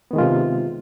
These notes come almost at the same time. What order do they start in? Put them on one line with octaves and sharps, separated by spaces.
B3 D#3 G#3 F4 C3